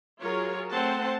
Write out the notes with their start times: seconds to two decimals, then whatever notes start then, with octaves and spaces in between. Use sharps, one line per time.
0.22 F#3 F4 G#4 A#4 C#5
0.71 A3 C4 C5 F#5 A5